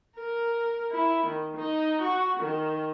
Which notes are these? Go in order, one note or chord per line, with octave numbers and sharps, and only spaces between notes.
A#4
E4
D#3
D#4
F#4
D#3